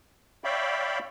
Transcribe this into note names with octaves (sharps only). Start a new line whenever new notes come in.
C#5 D5 E5 F5 G5 B5